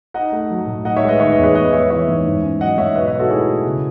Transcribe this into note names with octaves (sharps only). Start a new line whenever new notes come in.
D#4 D#5 F#5
A3
F#3
A2
D#4 D#5 F#5
C#5 E5
G#3
B4 D#5
D#3 C#5 E5
B4 D#5
E2
G#4 B4
B3 B4 D#5
G#3 C#5 E5
E3 C#5 E5
G#2
G#2
C#4
F#3 D#5 F#5
G#2 C#5 E5
B2 B4 D#5
C#5 E5
D#4
F#4 A4
A3 E4 G#4
B2
C#3